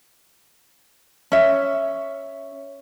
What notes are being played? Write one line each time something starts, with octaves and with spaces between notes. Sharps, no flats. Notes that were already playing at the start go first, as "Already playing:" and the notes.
C#4 E5